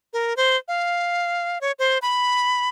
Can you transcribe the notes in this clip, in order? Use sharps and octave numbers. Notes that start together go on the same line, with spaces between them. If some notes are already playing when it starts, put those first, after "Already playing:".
A#4
C5
F5
C#5
C5
B5